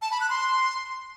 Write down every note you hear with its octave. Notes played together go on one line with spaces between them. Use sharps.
A5
B5
F#6
C6